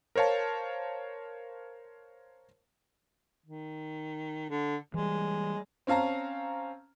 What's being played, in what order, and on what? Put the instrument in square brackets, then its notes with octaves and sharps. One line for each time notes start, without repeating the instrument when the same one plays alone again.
[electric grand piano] A#4 C5 C#5 F5 A5
[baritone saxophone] D#3
D3
[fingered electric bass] E3 G3 [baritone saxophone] G#3
[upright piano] C4 C#4 F5 A5 A#5